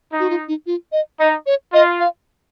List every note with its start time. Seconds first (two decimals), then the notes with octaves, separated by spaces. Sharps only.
0.13 D#4
0.20 F#4
0.30 F4
0.48 D#4
0.66 F4
0.92 D#5
1.19 D#4 D#5
1.46 C#5
1.73 F4 D#5
2.00 F5